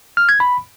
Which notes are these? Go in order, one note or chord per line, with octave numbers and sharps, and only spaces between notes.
F6
G#6
B5